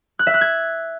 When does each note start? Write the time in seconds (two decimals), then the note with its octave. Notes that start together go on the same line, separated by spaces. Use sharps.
0.19 F#6
0.27 E5
0.34 F#6
0.41 G#6